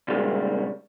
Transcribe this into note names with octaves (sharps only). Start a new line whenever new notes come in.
A#2 C#3 G3 G#3